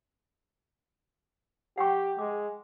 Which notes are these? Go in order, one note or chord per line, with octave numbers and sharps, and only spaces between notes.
G4 F#5 G5 C#6
G#3 D6